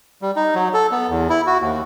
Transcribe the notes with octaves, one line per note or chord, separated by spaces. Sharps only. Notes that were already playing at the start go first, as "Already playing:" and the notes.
G3
D#4
F#3
A4
B3
E2
E4
F#4
D#2